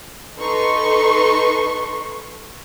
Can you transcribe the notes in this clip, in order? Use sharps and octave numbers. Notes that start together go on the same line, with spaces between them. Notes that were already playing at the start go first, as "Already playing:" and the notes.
D#4 A4 B4 C6 C#6